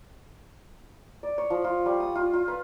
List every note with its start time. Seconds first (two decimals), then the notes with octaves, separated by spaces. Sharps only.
1.23 D5
1.38 C#5
1.50 F3
1.64 F4
1.86 G3
2.00 D#6
2.15 F4
2.33 F4
2.48 B4